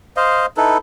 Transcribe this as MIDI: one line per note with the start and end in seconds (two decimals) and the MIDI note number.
0.17 0.46 72
0.17 0.46 75
0.17 0.46 77
0.57 0.78 63
0.57 0.78 64
0.57 0.78 69
0.57 0.78 71